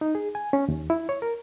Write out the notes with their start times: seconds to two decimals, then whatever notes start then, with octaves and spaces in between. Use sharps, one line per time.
0.01 D#4
0.15 G#4
0.35 G#5
0.53 C#4
0.68 D#2
0.90 E4
1.09 C#5
1.22 A#4